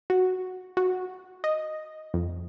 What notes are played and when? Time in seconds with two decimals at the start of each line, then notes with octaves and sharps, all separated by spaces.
0.10 F#4
0.77 F#4
1.44 D#5
2.14 F2